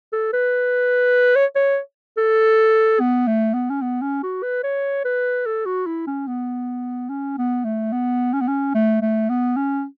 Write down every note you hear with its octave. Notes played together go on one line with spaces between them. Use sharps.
A4
B4
C#5
C#5
A4
B3
A3
B3
C#4
B3
C#4
F#4
B4
C#5
B4
A4
F#4
E4
C#4
B3
C#4
B3
A3
B3
C#4
B3
C#4
A3
A3
B3
C#4